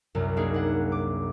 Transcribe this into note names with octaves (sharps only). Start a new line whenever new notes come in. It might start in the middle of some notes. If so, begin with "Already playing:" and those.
C2 F#2
A#3 D4 D#4 G#4 A#4
D4 F#5
D6